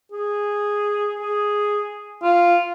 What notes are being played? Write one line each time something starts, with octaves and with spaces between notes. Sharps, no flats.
G#4
G#4
F4